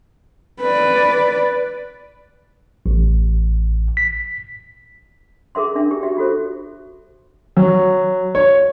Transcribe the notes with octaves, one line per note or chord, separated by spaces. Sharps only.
B4 D5
A1
B6
G#4 A#4 E5 C6
C#4 D4 E5
G4
F#4 E5
F4 F#4 A4 C5
F#3
C#5